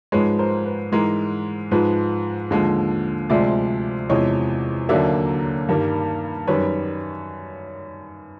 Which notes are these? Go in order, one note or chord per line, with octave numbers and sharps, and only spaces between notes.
G#2 F3 G#3 B4 C#5
A#4 C5
B4
G#2 E3 G#3 A#4
G#2 F3 G#3 B4
D#2 D3 F3 G#3
D2 C3 F3 G#3 D5 E5
E2 C3 F3 G#3 C#5 D#5
D#2 D3 F#3 A#3 D5 E5
G2 D#3 G3 A#3
F#2 D#3 G3 B4 C#5